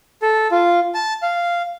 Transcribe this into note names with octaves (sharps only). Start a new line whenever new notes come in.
A4
F4
A5
F5